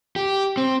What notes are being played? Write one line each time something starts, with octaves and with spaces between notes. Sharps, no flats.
G4
C4